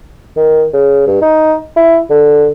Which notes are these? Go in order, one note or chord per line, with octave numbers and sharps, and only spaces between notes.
D#3
C#3
G2
D#4
E4
D3